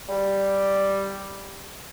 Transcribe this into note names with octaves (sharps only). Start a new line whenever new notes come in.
G3